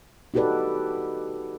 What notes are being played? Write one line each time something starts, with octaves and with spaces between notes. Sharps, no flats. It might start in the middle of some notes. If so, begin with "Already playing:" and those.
D#4 F#4 G4 A4 B4 D5